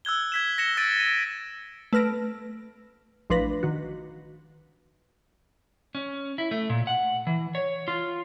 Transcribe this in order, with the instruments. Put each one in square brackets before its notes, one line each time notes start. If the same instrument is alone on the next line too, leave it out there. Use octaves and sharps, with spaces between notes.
[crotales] E6 F#6 G#6 G7
G#6 B6 E7
A#6 C#7 E7 G7
E6 A6 D7 D#7
D#7
[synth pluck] A3 B4 F6 A#6 D7
A1 F3 D4 B4 A#6
D#3 F#4
[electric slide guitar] C#4
E4
A3
A#2
F#5
E3
C#5
F4